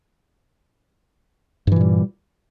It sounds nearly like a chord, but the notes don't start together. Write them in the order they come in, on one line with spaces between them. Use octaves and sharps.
G2 E3 A#2 G3